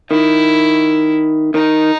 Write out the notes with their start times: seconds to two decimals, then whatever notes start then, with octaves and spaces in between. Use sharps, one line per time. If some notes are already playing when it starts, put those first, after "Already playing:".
0.11 D#3 E4
1.54 D#3 D#4